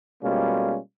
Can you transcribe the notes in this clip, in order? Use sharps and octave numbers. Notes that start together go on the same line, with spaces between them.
B2 G3 G#3 A#3 C#4 F4